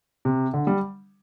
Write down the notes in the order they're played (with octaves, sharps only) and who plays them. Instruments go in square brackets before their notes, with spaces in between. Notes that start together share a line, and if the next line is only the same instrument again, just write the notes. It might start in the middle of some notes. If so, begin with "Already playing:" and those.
[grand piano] C3
D3
G3